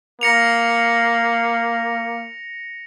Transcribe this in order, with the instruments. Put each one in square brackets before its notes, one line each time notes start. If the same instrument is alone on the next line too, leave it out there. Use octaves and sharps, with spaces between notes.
[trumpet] A#3 [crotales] A#6 C#7 F7